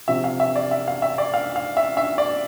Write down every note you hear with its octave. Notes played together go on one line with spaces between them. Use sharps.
C3 F3 E5
F5
E5
D5
E5
F5
E5
D5
F5
F5
E5
E5
D5